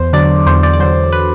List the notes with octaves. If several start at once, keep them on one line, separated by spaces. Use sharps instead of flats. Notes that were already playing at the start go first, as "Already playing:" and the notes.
Already playing: E2 C5
D3 F#3 D5
E2 C5
D5
D5
D3 F#3 C5
B4